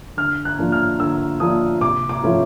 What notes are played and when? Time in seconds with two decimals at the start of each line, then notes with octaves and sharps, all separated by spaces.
0.17 D3 F6
0.45 F#6
0.58 F3 A#3 D4
0.72 F6
0.99 D3 E6
1.40 F3 A#3 D4 D#6
1.81 C3 D6
2.09 D6
2.23 F3 A3 C#4 E4